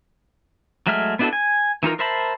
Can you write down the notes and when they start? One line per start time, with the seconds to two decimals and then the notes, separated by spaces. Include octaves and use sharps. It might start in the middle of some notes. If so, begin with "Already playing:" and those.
0.87 F#3 G#3 A3 E5 F6
1.19 B3 D4 E4 F#4 A4
1.33 G#5
1.83 E3 D#4 F4 A#4
1.99 A#4 C5 E5 A5 B5